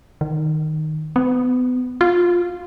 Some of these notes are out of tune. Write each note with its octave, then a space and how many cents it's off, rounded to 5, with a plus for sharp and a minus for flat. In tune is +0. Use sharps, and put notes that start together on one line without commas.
D#3 -5
B3 +30
F4 +15